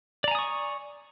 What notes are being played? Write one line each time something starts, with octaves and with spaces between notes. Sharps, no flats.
D5 G#5 A#5 C#6 D#6